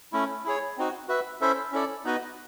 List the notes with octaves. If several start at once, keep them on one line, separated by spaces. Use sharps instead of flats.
A3 C#4 E4
E4 G#4 C#5
C4 D#4 F#4
F#4 B4 E5
C#4 E4 A4 C5 E5
C#4 E4 A4 D5
B3 D#4 F#4 B4 D#5